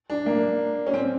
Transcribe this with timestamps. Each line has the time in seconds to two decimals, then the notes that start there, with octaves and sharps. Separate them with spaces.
0.10 D4
0.26 A#3
0.87 C#4
0.94 C4